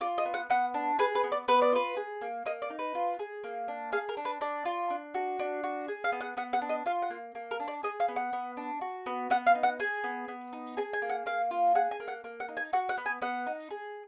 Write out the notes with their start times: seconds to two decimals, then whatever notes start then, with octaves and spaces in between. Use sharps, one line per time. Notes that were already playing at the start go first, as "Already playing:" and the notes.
0.01 F4 D5
0.18 D#5
0.25 B3
0.34 F#5
0.50 B3 F#5
0.74 D4
0.99 G#4 B4
1.15 B4
1.24 B3
1.32 D5
1.48 B3 B4
1.62 D5
1.72 F4 B4
1.97 G#4
2.21 A#3
2.46 A#3 D#5
2.62 D5
2.70 D#4
2.79 B4
2.95 F4
3.19 G#4
3.44 A#3
3.68 D4
3.92 G#4 F5
4.09 A#4
4.17 D4
4.25 B4
4.41 D4 D5
4.65 F4
4.90 D4
5.14 F#4
5.39 D4
5.64 F#4
5.88 G#4
6.04 F5
6.12 B3
6.21 F#5
6.37 B3 F#5
6.53 F#5
6.62 D4
6.69 D#5
6.86 F4 F5
7.02 F#5
7.10 A#3
7.35 A#3
7.51 A#4
7.60 D4
7.68 D5
7.83 G#4 D#5
8.00 F5
8.08 B3
8.16 F#5
8.33 B3
8.57 D4
8.81 F#4
9.06 B3
9.30 B3 F#5
9.47 F5
9.55 D#4
9.63 F#5
9.80 G#4 G#5
10.04 B3
10.28 B3
10.53 D#4
10.77 G#4 G#5
10.93 G#5
11.02 A#3
11.09 F#5
11.26 A#3 F5
11.51 F4
11.75 G#4 F#5
11.91 G#5
12.00 A#3
12.08 F#5
12.24 A#3
12.40 F#5
12.48 D#4
12.57 G#5
12.73 F#4 F#5
12.89 F#5
12.98 B3
13.06 G#5
13.22 B3 F#5
13.47 D#4
13.70 G#4